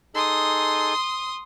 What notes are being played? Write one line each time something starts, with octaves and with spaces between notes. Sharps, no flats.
D#4 G#4 A4 C6 D#6